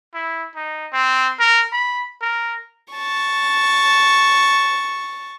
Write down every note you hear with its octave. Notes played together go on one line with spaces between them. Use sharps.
E4
D#4
C4
A#4
B5
A#4
A5 C#6